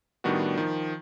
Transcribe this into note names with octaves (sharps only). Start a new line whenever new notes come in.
A2 D#3 G3 B3 D4 F#4
D#3 F3